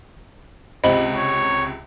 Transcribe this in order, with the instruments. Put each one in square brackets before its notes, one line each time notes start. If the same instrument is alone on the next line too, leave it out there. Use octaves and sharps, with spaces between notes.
[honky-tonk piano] C#2 C3 F#7 [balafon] C5 D#5 B5
[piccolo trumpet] C#5